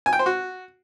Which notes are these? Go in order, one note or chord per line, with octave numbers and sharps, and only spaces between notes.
G#5
G5
C5
F#4